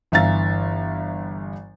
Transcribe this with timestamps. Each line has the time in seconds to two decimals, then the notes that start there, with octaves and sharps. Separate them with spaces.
0.12 G1 E3 E5 F5 A#5 A6